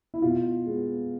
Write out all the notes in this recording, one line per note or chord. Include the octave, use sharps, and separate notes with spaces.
E4
B2 F4
G#3 B3